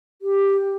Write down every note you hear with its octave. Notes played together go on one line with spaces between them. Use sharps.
G4